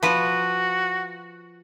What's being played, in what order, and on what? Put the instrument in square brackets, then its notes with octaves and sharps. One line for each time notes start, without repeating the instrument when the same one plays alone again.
[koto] F3 B4 [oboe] F#4